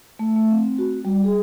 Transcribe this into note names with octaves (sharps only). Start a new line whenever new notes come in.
A3
A3
C4
F#4
G3
G#4